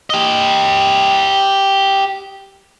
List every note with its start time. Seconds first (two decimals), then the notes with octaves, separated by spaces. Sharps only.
0.10 G4 D#5